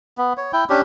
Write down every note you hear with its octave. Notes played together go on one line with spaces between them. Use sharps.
B3
C#5
E4 G5
C#4 D4 G4